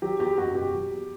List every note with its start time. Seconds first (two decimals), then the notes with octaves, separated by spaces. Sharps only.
0.02 F#3 G4
0.19 E2 G4
0.37 F#1 F#4
0.55 B2 G4
0.73 F#3
0.91 E2